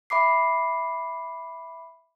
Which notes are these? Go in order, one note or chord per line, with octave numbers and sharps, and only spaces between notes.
E5 B5 D6 C7